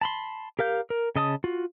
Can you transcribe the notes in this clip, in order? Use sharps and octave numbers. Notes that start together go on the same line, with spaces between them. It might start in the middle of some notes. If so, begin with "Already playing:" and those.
A5 B5 C6
G4 A#4 F5 G6
A#4
C#3 D#5 A5 D#6
F4 F#4